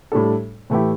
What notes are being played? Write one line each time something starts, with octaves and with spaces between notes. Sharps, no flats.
A2 G3 D4 A4
A2 E3 A3 E4 G4